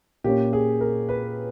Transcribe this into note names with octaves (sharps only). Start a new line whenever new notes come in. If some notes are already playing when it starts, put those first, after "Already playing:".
A#2 A#3 C#4 G4
G#4
A#4
B4